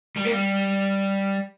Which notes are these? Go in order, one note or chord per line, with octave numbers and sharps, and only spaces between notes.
G3
A#3
G3